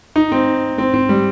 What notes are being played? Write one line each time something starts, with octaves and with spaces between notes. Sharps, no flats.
D#4
C4
C4
C4
G3